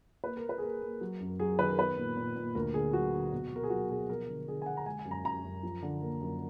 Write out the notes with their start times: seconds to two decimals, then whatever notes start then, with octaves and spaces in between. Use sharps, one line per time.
0.24 A#3 B4
0.37 A#4
0.44 A#3
0.49 B4
0.58 G#4
0.62 A#3 A#4
0.82 A#3
1.01 F#3
1.20 F#2
1.40 F#3 G#4
1.59 D#3 B4
1.69 A#4
1.78 B3 B4
1.98 A#2
2.17 A#2
2.36 A#2
2.55 D2 A#4
2.74 D3 G#4
2.93 F#3 F#4
3.13 D3
3.32 B2
3.52 B2 A#4
3.63 G#4
3.70 F#3 F#4
3.90 B2 G#4
4.09 F3 A#4
4.28 D3
4.47 D3 G#4
4.62 G#5
4.66 D3 F#5
4.77 A#5
4.86 G#3 G#5
4.99 G#5
5.05 F#2
5.11 A#5
5.24 F#2 A#5
5.44 F#2
5.63 F3
5.82 D3
6.01 A#3
6.21 F#2